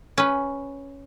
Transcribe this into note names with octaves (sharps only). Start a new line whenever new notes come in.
C#4 B4